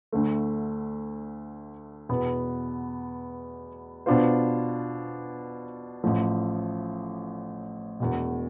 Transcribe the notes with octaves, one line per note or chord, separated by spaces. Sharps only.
D2 D3 A3
E2 B2 B3
B2 B3 D4 F4 C5
A1 A2 F3
E1 E2 B2